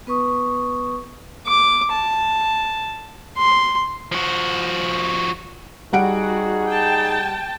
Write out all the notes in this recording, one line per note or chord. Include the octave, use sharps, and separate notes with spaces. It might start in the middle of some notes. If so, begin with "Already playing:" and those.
B3 B4 C#6 D#6
D6
A5
C6
F3 F#4
G3 D#4 F#4 G#4 F#5 D7
G5 A5